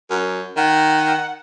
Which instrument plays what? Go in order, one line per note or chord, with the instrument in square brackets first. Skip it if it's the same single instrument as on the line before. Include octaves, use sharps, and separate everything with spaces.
[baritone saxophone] F#2
[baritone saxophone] D#3 [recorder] F#5